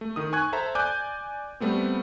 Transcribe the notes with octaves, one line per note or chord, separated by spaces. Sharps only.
A3
D#3 D#6
G#5 C#6 F#6 G#6
A4 C5 E5 A5 A#5
D5 G#5 D6 F#6 G6
G3 A3 B3 C4